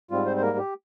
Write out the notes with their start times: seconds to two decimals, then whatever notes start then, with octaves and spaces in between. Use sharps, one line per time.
0.11 G#2 G3 C4 F4
0.26 C4 C5
0.37 C5
0.42 A#3 A#4
0.58 G4